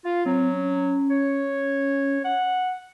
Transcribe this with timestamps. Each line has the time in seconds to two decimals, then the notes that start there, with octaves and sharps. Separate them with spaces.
0.05 F4 F5
0.26 F#3 C4
0.53 C#4
1.10 C#5
2.25 F#5